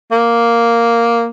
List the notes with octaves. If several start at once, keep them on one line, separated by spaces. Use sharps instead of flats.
A#3